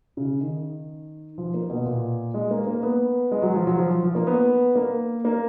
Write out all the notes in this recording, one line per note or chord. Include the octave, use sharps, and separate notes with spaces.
C#3
D#3
F3
A#3
B2
A#2
G#3
A#3
A#3
B3
G#3
F#3
F3
F#3
F3
F3
A#3
B3
A#3
A#3